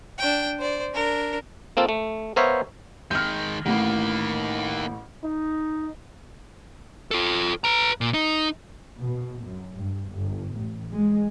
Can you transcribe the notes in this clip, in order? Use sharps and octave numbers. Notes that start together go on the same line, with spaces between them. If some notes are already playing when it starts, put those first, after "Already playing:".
D4 G5
C5 D5
D4 A#4
A#3 C4 F4 A4
A3
B3 A#4 C5 C#5 E5 F5
D#3 G#3 F6 G6
A1 A2 D#3 A#3
D#4
F4 A4
B4 A#5
A#2
D#4
B2
F#2
G2
G1
A1
G#3